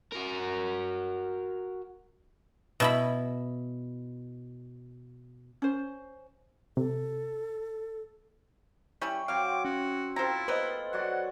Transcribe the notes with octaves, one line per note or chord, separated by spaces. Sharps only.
F#4 A#4
B2 E4 B5
C#4 C5
C3 A4
G3 C#4 E4 G5 C#6
F#3 C4 F5 D6
C#4 F#4
C4 E4 F4 A4 C5 A#5
A#3 B3 B4 C5 D#5
F#3 F#4 D5 F#5